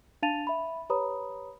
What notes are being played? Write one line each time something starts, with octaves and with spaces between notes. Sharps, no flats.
D4 F5 A5 A6 D#7 F7
E5 B5
G4 B4 C#5 A#5 B5 D#6